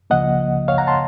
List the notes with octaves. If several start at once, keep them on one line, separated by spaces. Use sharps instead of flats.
C#2 C#3 F3 A#3 D#5 F#5
C#5 F5
F#5 A#5
A5 C6